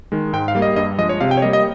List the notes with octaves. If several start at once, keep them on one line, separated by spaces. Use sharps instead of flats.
D#3 G#3
G#2 G5
F5
G3 A#3
D#5
G2 D#5
F3 G#3 D#5
C#5
C3 F5
G5
C#5
G3 A#3 D#5
D#5